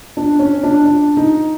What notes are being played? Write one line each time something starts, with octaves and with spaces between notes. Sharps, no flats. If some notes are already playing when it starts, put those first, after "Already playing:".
D4
C#4
D4
D4
D#4